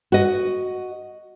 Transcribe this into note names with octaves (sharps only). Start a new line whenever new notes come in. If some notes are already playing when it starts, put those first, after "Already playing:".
F#4 D#5